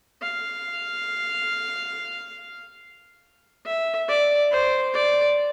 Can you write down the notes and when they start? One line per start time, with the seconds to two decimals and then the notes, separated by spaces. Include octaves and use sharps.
0.22 F5
3.66 E5
4.08 D5
4.51 C5
4.94 D5